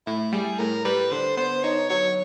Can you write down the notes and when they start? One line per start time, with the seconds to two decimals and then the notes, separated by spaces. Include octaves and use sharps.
0.07 A2 E4
0.33 G3 G#4
0.59 A2 A#4
0.85 G3 B4
1.11 D3 C5
1.37 B3 C5
1.64 D#4 C#5
1.90 F#3 C#5